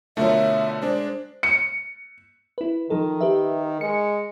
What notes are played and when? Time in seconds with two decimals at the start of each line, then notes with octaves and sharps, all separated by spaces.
0.17 B2 D3 A3 F4 A#4 C#5 E5
0.82 G#3 D4 C5
1.43 C#7
2.58 E4 B4
2.90 D#3 F3 D#4 A4
3.21 G4 B4 E5
3.81 G#3 C#7